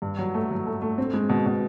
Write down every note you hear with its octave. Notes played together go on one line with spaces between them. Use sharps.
G2
F#3
A3
F#3
A3
A3
C4
G#3
B2
B2